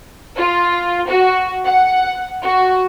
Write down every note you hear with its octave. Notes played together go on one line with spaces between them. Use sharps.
F4
F#4
F#5
F#4